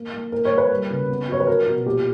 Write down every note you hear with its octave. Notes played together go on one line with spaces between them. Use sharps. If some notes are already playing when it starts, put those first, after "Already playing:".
Already playing: A#3
A#3
A#3 A#4
C#5
A#3
B4
G3
C#3
B3
F#3 C#5
B4
F#3 A#4
B2
A#2 G4